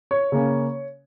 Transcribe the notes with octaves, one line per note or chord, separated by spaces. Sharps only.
C#5
C#3 A#3 C#4